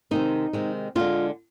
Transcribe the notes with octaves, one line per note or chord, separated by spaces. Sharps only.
C3 D#3 G#3 D#4
C3 D#3 G#3
D3 G#3 F4